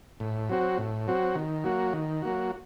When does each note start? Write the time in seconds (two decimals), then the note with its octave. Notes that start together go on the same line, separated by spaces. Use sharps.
0.20 A2
0.49 F#3 C4 F#4
0.78 A2
1.07 F#3 C4 F#4
1.35 D#3
1.64 F#3 A#3 F#4
1.93 D#3
2.22 F#3 A#3 F#4